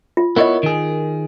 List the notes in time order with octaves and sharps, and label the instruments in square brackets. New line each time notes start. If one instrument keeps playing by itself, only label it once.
[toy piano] F4
[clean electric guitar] B3 E4 C#5 [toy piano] A#4 D#5
[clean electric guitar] D#3 G#4